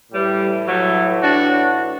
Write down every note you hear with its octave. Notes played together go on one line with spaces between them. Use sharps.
A2 E3 G3
F#3 A3
D4 F#4